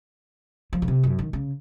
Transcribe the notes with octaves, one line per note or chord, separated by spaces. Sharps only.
F3
C#3
C3
F#2
D#3
C#3